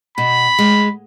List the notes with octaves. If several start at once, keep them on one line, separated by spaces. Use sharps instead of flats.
B2 B5
G#3